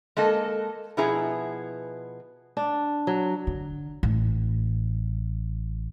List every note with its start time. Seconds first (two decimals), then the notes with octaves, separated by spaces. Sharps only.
0.17 G#3 A#3 A4 D#5
0.97 B2 F3 B3 E4 G#4 A#5
2.57 D4
3.07 F#3
3.47 D3
4.03 A1